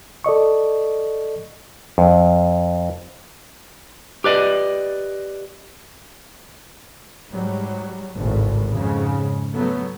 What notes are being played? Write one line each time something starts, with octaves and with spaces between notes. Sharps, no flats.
A4 D5 D#5 C#6
F2
G4 B4 D5 D#5
G#2 F#3 G3
G#1 C#2 A2
F2 G#2 C#3
F#3 A3 B3